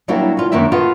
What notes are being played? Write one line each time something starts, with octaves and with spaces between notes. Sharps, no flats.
F#3 G3 A#3 D4 E4 F#4
B3 F4
F#2 D#3 A#3 D4 E4 E5
B3 F4 F#4 A4